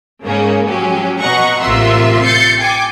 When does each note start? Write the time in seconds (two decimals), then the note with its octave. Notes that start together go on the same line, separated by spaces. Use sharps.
0.25 G#2 C#3 A#3 C#4
0.69 F3 F#3 C#4 G4
1.19 B2 D#5 F#5 A#5 C#6
1.61 A1 C3 A#3 F4 E5 C6
2.24 G6 A6 C7 C#7
2.60 G5 G#5 D6